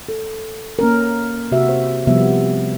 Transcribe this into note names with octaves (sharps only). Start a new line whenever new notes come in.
A4
A#3 C#4 A#4
C3 F#4 E5
C5
C3 F3 G3 B3 E5